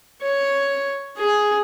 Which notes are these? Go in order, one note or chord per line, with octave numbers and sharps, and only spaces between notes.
C#5
G#4